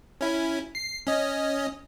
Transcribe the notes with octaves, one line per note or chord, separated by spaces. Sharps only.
C#4 E4
C7
C#4 D#5